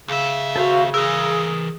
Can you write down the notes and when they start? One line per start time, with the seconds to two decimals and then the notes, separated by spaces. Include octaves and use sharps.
0.08 D#2 C#3 E5
0.56 F#4 A4 C5 F5
0.94 E3 G#4 A#4 A#5 E6